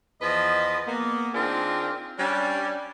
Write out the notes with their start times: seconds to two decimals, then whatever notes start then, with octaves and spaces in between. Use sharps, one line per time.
0.21 E2 F3 B4 D#5
0.88 A#3 B3
1.34 D#3 C4 D4 F4 G#4 A#4
2.18 G3 C#4 D4